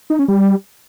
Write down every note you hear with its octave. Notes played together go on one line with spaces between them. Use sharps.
D#4
C#4
G3